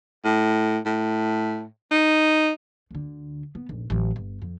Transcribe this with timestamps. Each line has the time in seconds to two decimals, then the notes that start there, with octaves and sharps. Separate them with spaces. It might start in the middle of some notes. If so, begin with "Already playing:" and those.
0.25 A2
0.85 A2
1.91 D#4
2.91 D2 D3
3.55 B3
3.69 F1 A#1
3.90 A1 F#3
4.16 G1
4.42 F2